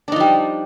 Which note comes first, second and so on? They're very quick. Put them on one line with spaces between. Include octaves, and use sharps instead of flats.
D4 D#4 F3 G3